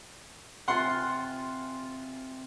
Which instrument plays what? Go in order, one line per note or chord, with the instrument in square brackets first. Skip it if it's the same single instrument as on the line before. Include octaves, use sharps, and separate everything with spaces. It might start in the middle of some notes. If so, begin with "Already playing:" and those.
[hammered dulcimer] C3 F4 G#5 [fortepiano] F#5 C6